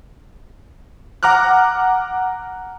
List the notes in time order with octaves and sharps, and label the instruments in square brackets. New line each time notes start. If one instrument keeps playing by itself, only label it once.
[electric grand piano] F#5 A#5 D6 F6 F#6